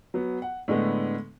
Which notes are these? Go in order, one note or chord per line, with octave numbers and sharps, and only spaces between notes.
F#3 B3
F#5
A2 D3 G#3 A3 B3